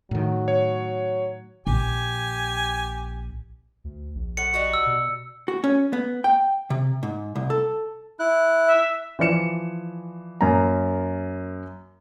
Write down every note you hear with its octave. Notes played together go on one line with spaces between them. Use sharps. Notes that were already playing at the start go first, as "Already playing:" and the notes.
A2 D#3 F#3
C#5
A#1 G4 G#5
D2
A#1
A2 F#5 C#7
G3 D#4 F#4
E6
B2
F#4
C#4
B3
G5
C3
G#2
C2
A4
E4 F#6
E5
E3 F3 D5 C#7 E7
F#2 A#3 A#5